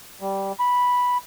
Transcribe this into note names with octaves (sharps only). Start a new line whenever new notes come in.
G3
B5